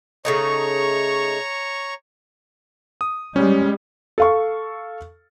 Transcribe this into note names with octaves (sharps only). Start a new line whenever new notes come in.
C#3 A3 D#4 C#5 A#5 C#6
D#6
G3 G#3 C#4
A4 F5 C#6